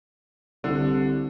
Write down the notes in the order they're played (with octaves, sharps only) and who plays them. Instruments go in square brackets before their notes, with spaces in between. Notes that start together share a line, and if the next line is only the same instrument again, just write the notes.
[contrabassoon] C2 [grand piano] D3